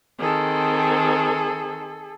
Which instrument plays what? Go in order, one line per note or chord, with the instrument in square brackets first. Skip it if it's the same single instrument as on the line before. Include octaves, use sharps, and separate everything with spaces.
[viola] D#3 C4 [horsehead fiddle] G#4 A4